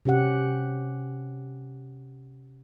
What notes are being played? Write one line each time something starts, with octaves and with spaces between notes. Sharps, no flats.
C3 C#4 G4 F#5